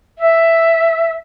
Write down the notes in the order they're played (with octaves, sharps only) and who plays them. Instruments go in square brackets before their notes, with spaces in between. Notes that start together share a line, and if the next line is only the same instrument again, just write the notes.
[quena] E5